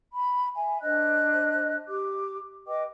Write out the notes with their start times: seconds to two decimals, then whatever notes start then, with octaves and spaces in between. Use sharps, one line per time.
0.12 B5
0.55 E5 G#5
0.82 D4 C5 D#5 F#6
1.87 G4 D6
2.66 B4 D#5 G5 D6